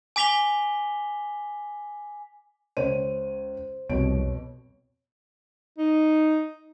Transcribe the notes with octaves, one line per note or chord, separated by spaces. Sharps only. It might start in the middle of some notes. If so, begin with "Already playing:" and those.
G#5 D6 B6 F7 G7
C#2 C5 C#5 D#7
C2 F2 B2 C#5 D7
D#4